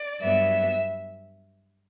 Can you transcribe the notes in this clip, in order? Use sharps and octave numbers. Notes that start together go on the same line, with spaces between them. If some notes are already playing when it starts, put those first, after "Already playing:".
Already playing: D5
G2 F#3 B3 E5